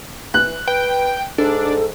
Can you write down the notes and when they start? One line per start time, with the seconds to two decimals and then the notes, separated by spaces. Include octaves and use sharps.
0.34 E3 F#6
0.68 B4 G5
1.38 G#2 D4 A4